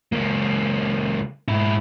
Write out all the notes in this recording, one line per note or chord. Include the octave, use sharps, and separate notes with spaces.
C#2 A#3
G#2 E4